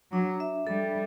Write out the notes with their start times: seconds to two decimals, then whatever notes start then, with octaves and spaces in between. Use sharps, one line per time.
0.12 F#3 D4
0.40 E5
0.67 G3 A4